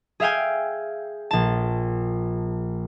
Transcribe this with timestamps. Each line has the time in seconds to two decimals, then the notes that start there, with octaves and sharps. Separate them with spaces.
0.20 G#4 E5 F5 G5 G#5
1.31 A#1 A5